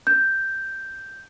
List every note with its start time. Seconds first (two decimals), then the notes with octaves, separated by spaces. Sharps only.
0.07 G6